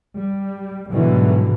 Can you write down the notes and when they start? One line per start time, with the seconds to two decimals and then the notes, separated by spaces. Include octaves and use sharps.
0.17 G3
0.91 G#2 B2 D3 E3 F#3 G3